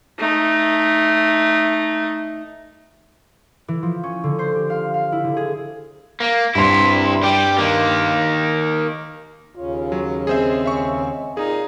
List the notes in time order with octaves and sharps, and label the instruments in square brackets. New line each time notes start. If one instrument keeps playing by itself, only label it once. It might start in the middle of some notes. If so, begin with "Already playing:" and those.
[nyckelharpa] A3 D#4
[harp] E3
F3
C#4
D3
C5
G4
F5
F5
E4
D3
G#4
[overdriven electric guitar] A#3
[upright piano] G2 C6 [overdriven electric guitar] C3 E4
[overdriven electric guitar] G3 G4
D#3 A#3
[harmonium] D#2 C#3 C#4 [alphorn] F4
[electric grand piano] F#3
[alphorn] G#3 [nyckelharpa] C4 [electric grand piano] G#4 C5 E5
[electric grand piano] E5 C#6
[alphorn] A#2 [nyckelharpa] D#4 [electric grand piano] G#4 [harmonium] F5